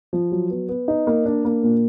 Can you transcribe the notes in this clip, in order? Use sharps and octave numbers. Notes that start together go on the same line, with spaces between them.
F3
F#3
B3
B3
D#4
A#3
D4
A#3
A#2